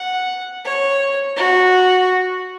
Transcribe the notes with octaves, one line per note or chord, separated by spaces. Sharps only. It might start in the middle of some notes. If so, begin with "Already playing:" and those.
Already playing: F#5
C#5
F#4